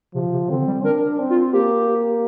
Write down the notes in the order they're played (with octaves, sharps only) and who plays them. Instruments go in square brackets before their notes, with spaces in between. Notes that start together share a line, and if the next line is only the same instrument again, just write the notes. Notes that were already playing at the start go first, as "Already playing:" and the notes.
[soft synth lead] C3 [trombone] F3
[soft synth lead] C3
[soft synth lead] D3 [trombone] C4
[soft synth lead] G3
[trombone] D4 [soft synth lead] A#4
[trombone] C4
[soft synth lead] F4
[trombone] A#3 [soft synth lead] G4